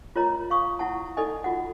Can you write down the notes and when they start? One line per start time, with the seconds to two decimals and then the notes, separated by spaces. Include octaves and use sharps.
0.16 F4 A#4 C#5 D#5 A#5
0.50 F5 C#6 D#6
0.79 E4 F#5 A5
1.17 D#4 A4 D5 D#5 G#5
1.44 F4 F#4 F#5